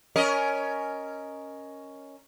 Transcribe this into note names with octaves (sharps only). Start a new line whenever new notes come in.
C#4 A#4 D#5